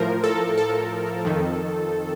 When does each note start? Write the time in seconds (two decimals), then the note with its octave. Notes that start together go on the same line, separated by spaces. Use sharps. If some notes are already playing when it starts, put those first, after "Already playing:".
Already playing: A2 F3 A#4
0.24 A4
0.58 A4
1.25 F2 D#3